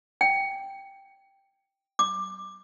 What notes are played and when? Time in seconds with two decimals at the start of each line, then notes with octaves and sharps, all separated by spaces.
0.21 G5
1.99 D6